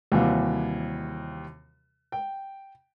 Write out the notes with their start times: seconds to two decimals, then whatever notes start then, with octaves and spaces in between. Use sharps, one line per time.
0.12 D#2 C3 E3 G3 F#4 F5
2.12 G5